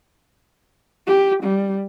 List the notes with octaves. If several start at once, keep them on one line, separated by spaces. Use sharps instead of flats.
G4
G3